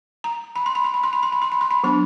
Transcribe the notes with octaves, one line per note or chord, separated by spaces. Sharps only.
A#5
B5
C6
B5
C6
B5
C6
B5
C6
B5
C6
B5
C6
B5
F#3 B3 D4 B5